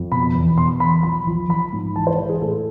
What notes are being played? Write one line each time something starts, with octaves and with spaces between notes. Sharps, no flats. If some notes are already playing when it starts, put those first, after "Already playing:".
Already playing: F2
B2 B5
E2
B2 C6
E2 B5
F3 B5
F3
F3 B5
G#2
E3 A5
C5
E3 B4
G#4
A2 A4